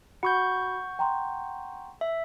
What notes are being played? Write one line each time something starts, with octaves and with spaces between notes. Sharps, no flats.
F#4 F#5 B5 C#6 G6 C#7
G5 A#5 C6
E5